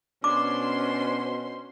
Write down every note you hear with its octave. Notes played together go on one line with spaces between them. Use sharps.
B2 C#4 D4 C5 C6 D6